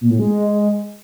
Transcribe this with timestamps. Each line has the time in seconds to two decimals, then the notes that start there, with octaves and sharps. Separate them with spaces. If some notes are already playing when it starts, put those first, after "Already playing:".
0.01 A#2
0.10 A2
0.19 G#3